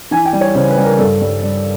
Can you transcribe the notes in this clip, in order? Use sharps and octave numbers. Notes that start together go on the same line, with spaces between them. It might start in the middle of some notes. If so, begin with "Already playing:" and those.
E3 G#5
G5
G3
C#5
C#3 C5
B4
G3
A#4
G2 A4
G3
G3